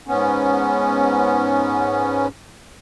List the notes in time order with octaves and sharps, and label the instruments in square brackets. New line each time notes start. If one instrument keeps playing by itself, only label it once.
[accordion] G#2 B3 C#4